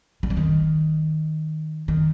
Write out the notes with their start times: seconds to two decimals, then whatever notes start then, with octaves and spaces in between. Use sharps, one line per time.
0.23 G3
0.30 F3
0.37 D#3
1.88 D#3